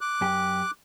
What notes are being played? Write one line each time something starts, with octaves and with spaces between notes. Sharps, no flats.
D6 F#6
F#2 G4